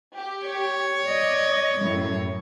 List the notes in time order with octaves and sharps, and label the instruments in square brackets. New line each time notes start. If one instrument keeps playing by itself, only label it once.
[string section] G4
[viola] C#5
[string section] D5 D#5
F#2 A2